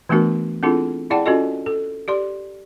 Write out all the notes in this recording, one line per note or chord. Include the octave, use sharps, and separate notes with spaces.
E3 A3 B3 D4 F#4 A#4
C4 D4 E4 F4 G#4 A4
E4 G#4 D5 F#5 G5 A5
C#4 F4 F#4 A4 D#5
A4
G4 D5 C6